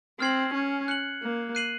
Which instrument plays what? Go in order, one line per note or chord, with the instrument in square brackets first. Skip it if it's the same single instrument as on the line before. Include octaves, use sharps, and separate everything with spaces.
[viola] C4 [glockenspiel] F6 G#6 C7 F#7
[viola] C#4
[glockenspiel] F#6 C#7 F#7
[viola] A#3
[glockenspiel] F#6 C7 D#7 F#7